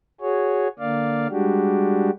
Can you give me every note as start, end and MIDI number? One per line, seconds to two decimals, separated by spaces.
0.21 0.68 66
0.21 0.68 68
0.21 0.68 73
0.79 1.27 50
0.79 1.27 58
0.79 1.27 74
0.79 1.27 77
1.30 2.10 55
1.30 2.10 56
1.30 2.10 62
1.30 2.10 66
1.30 2.10 67